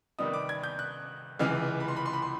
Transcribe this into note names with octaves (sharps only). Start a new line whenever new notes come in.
C3 D#3 G3 B3 D#4 D#6
D6
G#6
G6
F#6
C#2 C3 E3 G#3 F6
B5
C6
B5
C6
B5
C6